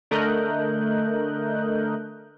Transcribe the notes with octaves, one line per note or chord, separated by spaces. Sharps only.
D3 A3 A#4 D#5 F#6 G6